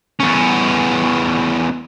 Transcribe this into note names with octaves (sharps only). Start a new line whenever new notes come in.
E2 C#4